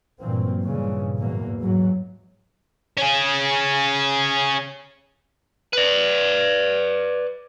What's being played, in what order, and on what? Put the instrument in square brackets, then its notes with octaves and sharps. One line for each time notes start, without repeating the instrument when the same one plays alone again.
[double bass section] G2 A#2 E3 F#3 A#3 C4
G2 A#2 C#3 E3
E2 G#2 E3 F#3 A#3
G#2 E3 F#3
[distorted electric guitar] C#4 G#4
[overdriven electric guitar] B4 D5